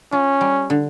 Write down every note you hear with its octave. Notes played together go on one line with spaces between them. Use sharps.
C#4 F4
G3
D3